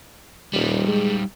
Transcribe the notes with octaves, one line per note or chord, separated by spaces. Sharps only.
D#1 G3 D#4
G#3